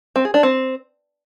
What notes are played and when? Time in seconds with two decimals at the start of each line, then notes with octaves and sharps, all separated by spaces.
0.16 C4
0.25 G#4
0.34 D4
0.43 C4